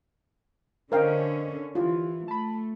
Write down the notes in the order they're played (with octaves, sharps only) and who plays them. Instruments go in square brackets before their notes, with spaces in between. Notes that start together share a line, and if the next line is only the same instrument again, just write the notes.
[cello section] D3 C#4 [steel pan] A#4 F5 G5 [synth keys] C5 D#5
[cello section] E3 [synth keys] E4 G4 [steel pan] F4
[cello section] A3 [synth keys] A5 B5